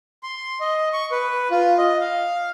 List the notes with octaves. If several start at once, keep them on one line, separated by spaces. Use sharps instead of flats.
C6
D#5
C#6
B4
F4
D#5
F5